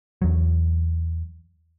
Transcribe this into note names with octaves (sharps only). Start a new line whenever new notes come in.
E2 F#3